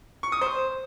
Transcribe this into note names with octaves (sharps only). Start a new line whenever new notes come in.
C#6
D#6
C5